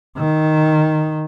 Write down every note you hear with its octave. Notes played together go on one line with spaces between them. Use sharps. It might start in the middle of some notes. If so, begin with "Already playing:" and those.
D#3